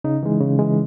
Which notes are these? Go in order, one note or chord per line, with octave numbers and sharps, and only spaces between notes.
C#3 D#4
E3 G#3
C#3
E3 G#3